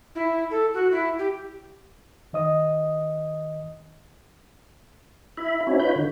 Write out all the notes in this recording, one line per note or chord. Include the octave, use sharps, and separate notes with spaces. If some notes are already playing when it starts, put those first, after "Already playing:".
E4
A4
F#4
E4
G4
D#3 D#5 D#6
E4 E5 B5
C4 C#4 D#4 E4 F#4 C#5
D#4 F4 B4 C#5 B5 G6
D3